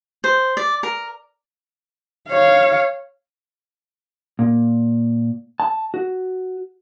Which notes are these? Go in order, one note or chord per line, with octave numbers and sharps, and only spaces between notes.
C5
D5
A#4
C#5 F5
A#2
A5
F#4